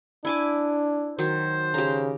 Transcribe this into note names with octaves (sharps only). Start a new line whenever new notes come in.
D4 E4 G#5 D6
D#3 F#3 C5
C#3 G4 A#5